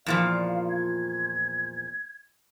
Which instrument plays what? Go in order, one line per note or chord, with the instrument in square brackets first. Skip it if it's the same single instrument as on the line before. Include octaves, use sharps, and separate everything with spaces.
[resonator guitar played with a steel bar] E2 A#2 F3 [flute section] D5 F5
[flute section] G#6